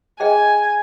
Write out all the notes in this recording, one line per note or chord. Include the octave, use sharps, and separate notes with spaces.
G#4 D#5 G5 G#5